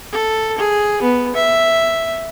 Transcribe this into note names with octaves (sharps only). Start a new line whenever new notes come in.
A4
G#4
B3
E5